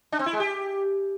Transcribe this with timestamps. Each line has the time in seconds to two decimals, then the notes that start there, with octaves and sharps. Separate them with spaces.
0.12 D4
0.19 C4
0.26 E4
0.33 G#3
0.40 G4